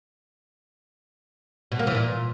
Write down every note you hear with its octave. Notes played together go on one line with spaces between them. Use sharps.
B2
A#3
E3
A#2